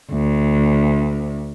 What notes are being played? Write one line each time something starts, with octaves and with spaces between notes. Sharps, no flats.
D2